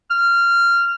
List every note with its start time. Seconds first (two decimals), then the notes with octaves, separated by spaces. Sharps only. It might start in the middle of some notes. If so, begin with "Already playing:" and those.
0.10 F6